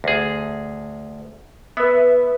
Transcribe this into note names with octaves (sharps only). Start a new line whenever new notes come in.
D2 G#4
B3 B4 E5